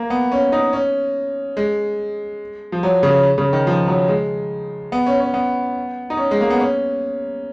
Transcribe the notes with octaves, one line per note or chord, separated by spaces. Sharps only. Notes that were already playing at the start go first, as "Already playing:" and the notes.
Already playing: A#3
B3
C#4
D#4
C#4
G#3
F3
F#3
C#3
C#3
D#3
F3
F#3
G#3
B3
C#4
C#4
B3
D#4
C#4
G#3
A#3
B3
C#4